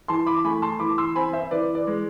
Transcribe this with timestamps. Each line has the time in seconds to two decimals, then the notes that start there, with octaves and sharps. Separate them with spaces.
0.08 E3 A5 C6
0.27 B5 D6
0.44 A3 G#5 B5
0.62 A5 C6
0.80 E3 B5 D6
0.98 C6 E6
1.16 C4 G#5 B5
1.33 C5 E5
1.51 E3 B4 D5
1.75 B4 D5
1.87 G#3